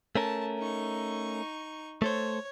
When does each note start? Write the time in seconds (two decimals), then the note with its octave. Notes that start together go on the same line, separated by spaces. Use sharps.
0.15 A3 C#4 A#4 A5
0.58 D#4 C#6
2.02 A3 A4 C5 C#5